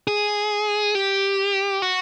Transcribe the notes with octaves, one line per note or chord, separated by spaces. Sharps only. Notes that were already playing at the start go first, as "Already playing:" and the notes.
G#4
G4
F#4